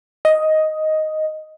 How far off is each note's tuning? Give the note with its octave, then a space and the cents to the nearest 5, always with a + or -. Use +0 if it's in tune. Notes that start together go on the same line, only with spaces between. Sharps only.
D#5 +5